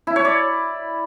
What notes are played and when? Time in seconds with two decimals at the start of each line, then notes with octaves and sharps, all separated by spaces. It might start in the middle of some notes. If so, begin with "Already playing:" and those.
0.07 E4
0.16 C#5
0.25 D5